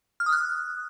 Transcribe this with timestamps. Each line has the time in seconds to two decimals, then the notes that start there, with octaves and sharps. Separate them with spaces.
0.20 F6
0.26 D#6
0.32 F#6